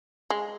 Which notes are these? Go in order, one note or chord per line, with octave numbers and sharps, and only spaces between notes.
G#3